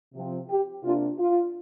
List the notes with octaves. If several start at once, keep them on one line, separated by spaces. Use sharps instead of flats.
C3 F3 C4
G4
C3 A#3 D4 F4
F4